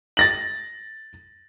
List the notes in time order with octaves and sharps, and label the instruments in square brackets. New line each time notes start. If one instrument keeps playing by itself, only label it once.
[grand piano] A6 A#6 F#7